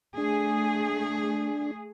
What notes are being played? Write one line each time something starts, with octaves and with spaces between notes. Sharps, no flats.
A3 D4 G#4